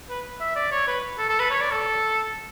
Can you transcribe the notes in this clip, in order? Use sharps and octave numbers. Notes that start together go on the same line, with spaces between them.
B4
E5
D5
C#5
B4
A4
A4
B4
C#5
D5
A4